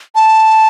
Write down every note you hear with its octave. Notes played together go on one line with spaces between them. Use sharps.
A5